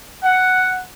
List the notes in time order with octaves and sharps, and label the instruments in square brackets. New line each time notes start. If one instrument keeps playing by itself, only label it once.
[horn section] F#5